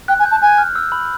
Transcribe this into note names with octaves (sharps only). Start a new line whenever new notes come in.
G5 F#6
G#5
G6
A5
G#5 F#6
F6
E6
B5